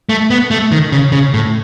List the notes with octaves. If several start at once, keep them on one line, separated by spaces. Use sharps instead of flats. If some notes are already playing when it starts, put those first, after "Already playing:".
A3
B3
A3
D#3
C#3
C#3
A2